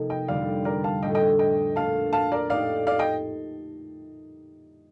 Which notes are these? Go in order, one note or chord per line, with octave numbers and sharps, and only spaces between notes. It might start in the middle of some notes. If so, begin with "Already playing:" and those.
Already playing: C3 F3 A#3 D#4 A4
D#5 G5
F2 D3 G3 C4 D5 F5
A#4 D5
F5 A5
A2 A3 D4 F4 D#5 G5
D#5 G5
D#5 G5
A#2 A3 D4 F4 F5 A5
F5 A5
A#4 D5
A2 A3 D#4 G4 D5 F5
D5 F5
D#5 G5